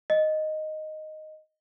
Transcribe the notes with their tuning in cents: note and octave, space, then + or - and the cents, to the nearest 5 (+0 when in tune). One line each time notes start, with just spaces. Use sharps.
D#5 -5